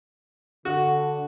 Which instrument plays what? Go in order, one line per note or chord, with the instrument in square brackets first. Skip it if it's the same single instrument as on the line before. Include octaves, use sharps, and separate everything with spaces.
[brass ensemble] D3 [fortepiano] F#4